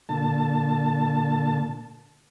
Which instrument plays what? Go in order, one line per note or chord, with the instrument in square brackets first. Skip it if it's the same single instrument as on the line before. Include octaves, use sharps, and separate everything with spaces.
[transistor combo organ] A#2 D3 A5